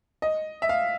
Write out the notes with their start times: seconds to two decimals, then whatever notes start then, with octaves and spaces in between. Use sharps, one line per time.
0.22 D#5
0.62 E5
0.69 F5